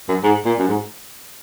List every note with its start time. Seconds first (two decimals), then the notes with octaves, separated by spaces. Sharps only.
0.09 F#2
0.24 G#2
0.46 A#2
0.59 F#2
0.68 G#2